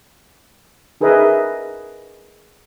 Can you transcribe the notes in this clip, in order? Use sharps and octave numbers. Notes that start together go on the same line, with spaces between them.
D#4 G#4 A#4 B4 D#5 E5